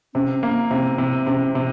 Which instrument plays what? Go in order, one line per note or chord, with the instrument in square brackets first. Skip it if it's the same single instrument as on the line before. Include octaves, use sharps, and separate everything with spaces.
[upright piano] C3 [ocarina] C#4
[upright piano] A#3
[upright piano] C3 [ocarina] C4
[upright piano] C3
[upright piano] C3 [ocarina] C#4
[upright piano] C3